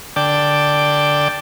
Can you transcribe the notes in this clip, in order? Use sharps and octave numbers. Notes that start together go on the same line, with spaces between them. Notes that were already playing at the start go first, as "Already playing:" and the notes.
D3 D5 G5 A5